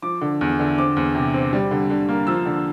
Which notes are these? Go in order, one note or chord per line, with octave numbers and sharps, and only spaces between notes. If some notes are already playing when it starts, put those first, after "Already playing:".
F3 D6
D3
E2
D3
C4 D6
E2
C3
C4
G3
D3
D3
A#3
F3 E6
D3